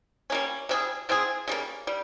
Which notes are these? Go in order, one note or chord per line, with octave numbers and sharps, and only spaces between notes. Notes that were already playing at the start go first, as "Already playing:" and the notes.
G3 A#3 C#4
C3 G3 C#4 G#4
F3 C4 F4 G#4
C#3 G3 A#3
G3